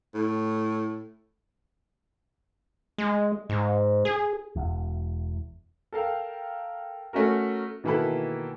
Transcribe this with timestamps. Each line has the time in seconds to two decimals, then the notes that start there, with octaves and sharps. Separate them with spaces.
0.14 A2
2.98 G#3
3.49 G#2
4.05 G#4
4.56 E1 E2
5.93 A4 A#4 F5 G5
7.13 A3 C#4 F#4 A#4
7.84 B2 D#3 E3 A#3 A4 B5